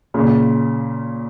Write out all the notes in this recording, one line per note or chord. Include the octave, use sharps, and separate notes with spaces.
A#2 C#3